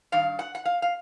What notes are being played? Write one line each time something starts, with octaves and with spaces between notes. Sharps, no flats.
G2 D#3 F5
F#5
F#5
F5
F5